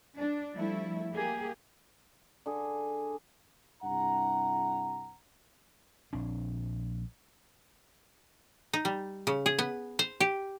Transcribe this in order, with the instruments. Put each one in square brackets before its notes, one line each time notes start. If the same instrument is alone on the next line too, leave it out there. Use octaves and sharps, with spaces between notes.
[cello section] D4
F3 G3 A3 E4
A#3 G4 G#4
[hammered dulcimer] D3 G#4
[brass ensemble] G2 C3 E4 F#5 A#5
[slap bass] A#1 C4 D4
[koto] D#4
G3
C#3
G#4
B3
C5
G4